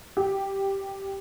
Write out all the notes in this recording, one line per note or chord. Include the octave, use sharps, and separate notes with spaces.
G4